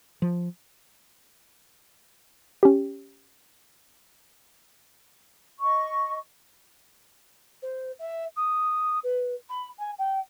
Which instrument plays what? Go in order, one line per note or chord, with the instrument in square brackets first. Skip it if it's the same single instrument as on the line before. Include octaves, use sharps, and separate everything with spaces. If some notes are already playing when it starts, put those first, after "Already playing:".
[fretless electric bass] F3
[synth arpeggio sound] C#4 G4
[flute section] D#5 C#6
[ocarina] C5
E5
D#6
B4
B5
G#5
G5